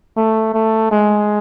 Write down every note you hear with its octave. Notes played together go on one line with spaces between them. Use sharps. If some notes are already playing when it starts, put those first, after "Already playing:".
A3
A3
G#3